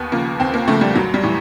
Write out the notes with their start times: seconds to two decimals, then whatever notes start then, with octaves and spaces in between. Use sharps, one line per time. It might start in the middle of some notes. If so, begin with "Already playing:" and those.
Already playing: D#2 B3
0.12 C#3 F3 A#3
0.39 D#2 C4
0.54 A#3
0.68 C#3 F3 A3
0.81 G3
0.95 A1 F#3
1.14 G3
1.23 A2 E3